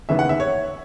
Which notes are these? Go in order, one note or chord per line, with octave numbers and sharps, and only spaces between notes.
D#2 C#3 E3 B3 E5
F#5
E5
C#5